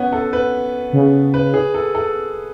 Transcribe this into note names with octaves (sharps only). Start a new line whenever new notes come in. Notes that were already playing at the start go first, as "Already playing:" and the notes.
Already playing: B3 C#4
A4
B4
C#3
B4
G#4
A4
A4